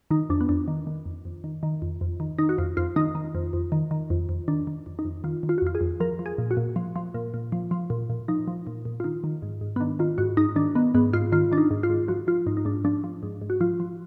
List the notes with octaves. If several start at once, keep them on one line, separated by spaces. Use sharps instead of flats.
D#3 D#4
F2 D4
B3
F2 D4
D#3
D#3
F2
F2
D#3
D#3
F2
F2
D#3
D#3 D#4
F#4
F2 F4
F2 F4
D#3 D#4
D#3
F2
F2
D#3
D#3
F2
F2
D#3 D4
D#3
F2
D#4
F2
D#3 F4
D#3
F4
F#4
F2 F4
G#4
F2
F3 A#4
F3
G#4
A#2
F#4
A#2
F3
F3
A#2
A#2
F3
F3
A#2
A#2
F3 D#4
F3
A#2
A#2
F4
D#3 D#4
D#3
G#2
G#2
B3
D#3 D4
D#3 F4
G#2 F#4
G#2 D#4
D#3 D4
D#3 B3
G#2 B3
G#2 F4
D#3 F4
D#3 D4
D#4
G#2
F4
G#2
F3 F#4
F3 F4
G#2 D#4
D#4
G#2 D4
F3 D4
F3
G#2
G#2
F#4
F3 F4
F3